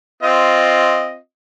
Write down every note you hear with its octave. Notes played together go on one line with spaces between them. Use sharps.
C4 F4 D#5